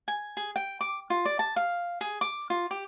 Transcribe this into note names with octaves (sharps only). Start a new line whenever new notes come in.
G#5
G#4
G5
D6
F4
D5
A5
F5
G#4
D6
F4
G4